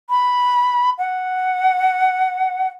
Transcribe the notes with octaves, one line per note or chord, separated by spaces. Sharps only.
B5
F#5